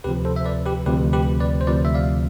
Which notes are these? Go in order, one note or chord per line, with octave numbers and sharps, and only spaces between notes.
D2 C3 F3 G4 B4
A4 C5
E5
B4 D5
G4 B4
D2 C3 F3 G4 B4
G4 B4
B4 D5
C5
D2 C3 F3 B4 D5
E5
D5 F5